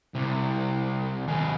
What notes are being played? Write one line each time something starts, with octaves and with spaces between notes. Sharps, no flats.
C2 C3
D#2 G#4